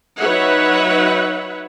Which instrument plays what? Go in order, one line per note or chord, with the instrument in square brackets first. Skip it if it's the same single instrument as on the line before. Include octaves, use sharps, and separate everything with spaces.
[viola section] F#3 D#4 B4 C#5 E5 F#5